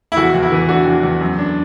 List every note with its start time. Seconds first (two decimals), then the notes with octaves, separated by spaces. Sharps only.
0.12 E4
0.17 E2 F#4
0.34 E2
0.43 E4
0.52 E3
0.69 D4 F#4
0.86 E2
1.03 E2
1.21 F#2
1.38 D4